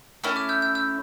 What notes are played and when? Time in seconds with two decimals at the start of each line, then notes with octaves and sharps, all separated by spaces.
0.24 A3 C#4 E4
0.36 D6 F6
0.49 E6 G6
0.62 E6 G6
0.75 E6 G6